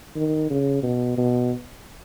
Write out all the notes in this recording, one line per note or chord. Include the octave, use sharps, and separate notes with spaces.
D#3
C#3
B2
B2